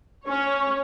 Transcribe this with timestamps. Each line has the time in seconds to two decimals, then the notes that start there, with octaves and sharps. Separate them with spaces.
0.27 C#4 C#5